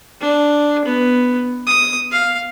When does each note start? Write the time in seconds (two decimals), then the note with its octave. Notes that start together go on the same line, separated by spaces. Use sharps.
0.21 D4
0.85 B3
1.67 D#6
2.12 F5